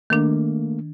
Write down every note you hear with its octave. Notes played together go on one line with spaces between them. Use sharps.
D#3 A3 A#3 D4